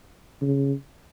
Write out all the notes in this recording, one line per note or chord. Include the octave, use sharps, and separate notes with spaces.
C#3